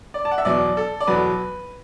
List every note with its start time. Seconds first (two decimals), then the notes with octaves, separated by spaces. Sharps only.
0.14 D5
0.25 A5
0.31 F#5
0.38 E5
0.45 E2 B2 F#3 D5
0.77 A4
1.01 D5
1.07 E2 B2 F#3 B4